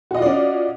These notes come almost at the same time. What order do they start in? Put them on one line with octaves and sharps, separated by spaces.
F#4 D#5 F4 D5 C#4